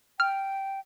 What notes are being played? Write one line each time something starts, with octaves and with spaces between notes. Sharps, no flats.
G5 F6